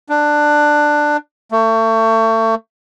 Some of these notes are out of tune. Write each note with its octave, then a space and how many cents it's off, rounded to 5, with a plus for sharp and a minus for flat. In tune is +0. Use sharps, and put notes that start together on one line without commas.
D4 +15
A3 +35